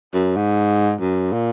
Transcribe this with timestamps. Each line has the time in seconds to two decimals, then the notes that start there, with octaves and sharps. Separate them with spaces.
0.14 F#2
0.36 G#2
1.00 F#2
1.32 A#2